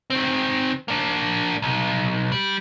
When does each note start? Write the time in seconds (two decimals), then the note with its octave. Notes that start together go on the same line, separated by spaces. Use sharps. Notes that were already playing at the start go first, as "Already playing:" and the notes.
0.10 D#3 C4
0.88 A#3 D4
1.62 B1
2.32 G3